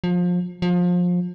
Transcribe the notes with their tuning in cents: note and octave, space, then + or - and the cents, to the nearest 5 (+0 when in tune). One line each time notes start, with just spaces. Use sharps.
F3 +25
F3 +25